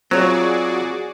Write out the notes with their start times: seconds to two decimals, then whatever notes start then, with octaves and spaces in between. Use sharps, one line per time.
0.11 F#3 C4 F4 F#4 G#4 C#5 D5